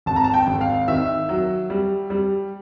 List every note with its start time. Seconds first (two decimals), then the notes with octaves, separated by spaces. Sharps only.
0.06 G#1 A5
0.16 A#5
0.24 A5
0.34 G5
0.47 G#1
0.61 F5
0.88 D#3 E5
1.29 F#3
1.70 G3
2.10 G3